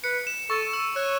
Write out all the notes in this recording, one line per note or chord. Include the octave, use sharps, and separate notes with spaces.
B4 C#7
E7
A4 C#6
E6
C#5 F#6